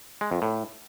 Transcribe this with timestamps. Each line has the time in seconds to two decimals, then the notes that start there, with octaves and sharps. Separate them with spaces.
0.21 G#3
0.31 F2
0.42 A2